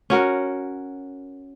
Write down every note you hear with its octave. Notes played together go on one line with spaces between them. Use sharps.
C#4 F#4 A#4 F#5